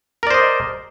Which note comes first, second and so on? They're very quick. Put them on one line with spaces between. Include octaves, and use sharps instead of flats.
A#4 D5 C5 D#5